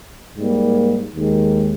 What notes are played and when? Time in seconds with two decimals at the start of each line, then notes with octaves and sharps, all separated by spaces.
0.36 G#2 G3 A#3
1.14 D#2 D#3 G#3